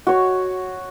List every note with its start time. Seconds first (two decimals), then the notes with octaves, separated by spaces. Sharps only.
0.07 F#4 C#5